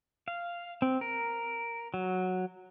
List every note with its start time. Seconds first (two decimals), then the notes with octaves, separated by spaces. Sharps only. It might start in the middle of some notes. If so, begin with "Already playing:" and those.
0.28 F5
0.82 C4
1.01 A#4
1.94 F#3